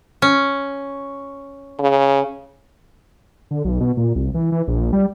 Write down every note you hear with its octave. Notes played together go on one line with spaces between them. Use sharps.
C#4
C#3
D3
B1
B2
A#2
C2
E3
E3
A#1
G3